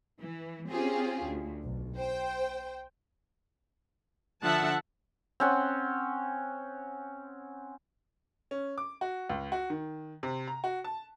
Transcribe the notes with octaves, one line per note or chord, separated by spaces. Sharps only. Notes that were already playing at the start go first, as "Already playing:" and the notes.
E3
C4 C#4 F4 G4 G#4
D2
B1
C5 G5
D3 F3 E5 F#5 A5
C4 C#4 F#5
C#4
D6
F#4
C#2
F#4
D#3
C3
A#5
F#4
A5